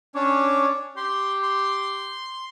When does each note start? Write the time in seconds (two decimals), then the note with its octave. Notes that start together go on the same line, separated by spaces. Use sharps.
0.15 C#4 D4 C#5 D6
0.97 G4 C6
1.42 C6